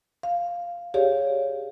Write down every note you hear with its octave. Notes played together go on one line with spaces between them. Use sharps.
F5
G4 G#4 C#5 D5 F5